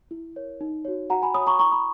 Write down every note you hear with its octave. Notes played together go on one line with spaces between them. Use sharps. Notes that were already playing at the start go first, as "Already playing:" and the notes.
E4
A#4 C#5
D#4
F#4 C#5
F#4 F#5 A#5
G#5 B5
C#5 B5 D#6
A#5 C#6
E4 A#5 C#6
B5 D#6